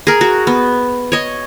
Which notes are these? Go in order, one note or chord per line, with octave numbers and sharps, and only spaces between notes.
G#4 A#4
F#4
B3
C#5 D#5